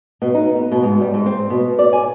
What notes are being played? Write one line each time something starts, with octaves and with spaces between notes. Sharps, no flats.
B2
D#4
B3
B2
G#2
G3
G#2
C4
B2
D5
G#5